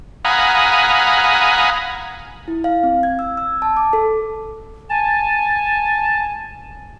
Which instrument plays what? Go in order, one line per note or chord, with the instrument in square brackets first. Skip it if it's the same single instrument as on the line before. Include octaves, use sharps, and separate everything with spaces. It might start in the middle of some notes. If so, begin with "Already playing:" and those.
[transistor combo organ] F5 F#5 G#5 A#5 B5 D#6
[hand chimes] E4
F5
C4
G#6
E6
E6
A5
D6
A4
[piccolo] G#5 [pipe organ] A5